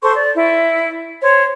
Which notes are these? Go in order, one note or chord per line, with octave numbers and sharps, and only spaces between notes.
A4 C5 C6 C#6
D5
E4
C5 C#5